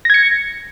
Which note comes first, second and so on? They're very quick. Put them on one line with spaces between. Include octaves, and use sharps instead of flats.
A#6 G#6 C#7